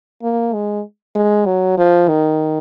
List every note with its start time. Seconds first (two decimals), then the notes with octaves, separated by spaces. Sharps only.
0.22 A#3
0.53 G#3
1.15 G#3
1.46 F#3
1.77 F3
2.08 D#3